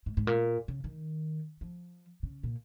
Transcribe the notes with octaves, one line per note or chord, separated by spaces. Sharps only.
G#2
G#2
A#2
C#3
D#3
F3
C#3
A#2